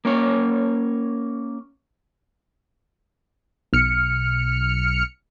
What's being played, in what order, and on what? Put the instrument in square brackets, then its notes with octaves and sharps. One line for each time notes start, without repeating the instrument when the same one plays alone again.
[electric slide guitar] A#3 C#4 C#5
[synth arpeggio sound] B1 F6 C#7